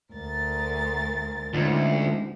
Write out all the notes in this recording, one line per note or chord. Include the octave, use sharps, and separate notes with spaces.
D2 A#4 A6
D2 G#2 F3